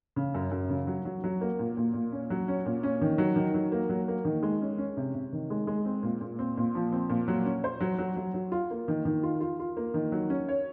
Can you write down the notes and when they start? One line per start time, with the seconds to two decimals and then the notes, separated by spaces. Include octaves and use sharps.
0.16 C#3
0.34 F#2
0.51 F#2
0.69 C#3
0.87 F#3
1.05 F#3
1.24 F#3
1.41 A#3
1.59 A#2
1.77 A#2
1.94 A#2
2.12 C#4
2.30 F#3
2.48 C#4
2.66 A#2
2.83 C#4
3.01 D#3
3.18 F#3
3.36 D#3
3.54 F#3
3.72 A#3
3.89 F#3
4.08 A#3
4.25 D#3
4.43 G#3
4.61 C#4
4.78 C#4
4.97 C3
5.15 C3
5.33 D#3
5.50 G#3
5.67 G#3
5.85 C4
6.03 A#2
6.21 A#2
6.39 C4
6.57 A#2
6.75 F3
6.92 C4
7.09 A#2
7.28 F#3
7.45 C#4
7.64 C5
7.80 F#3
7.98 F#3
8.16 F#3
8.34 F#3
8.52 F4
8.71 A#3
8.88 D#3
9.05 D#3
9.23 F4
9.41 F4
9.60 F4
9.77 A#3
9.94 D#3
10.12 F#3
10.30 C#4
10.48 C#5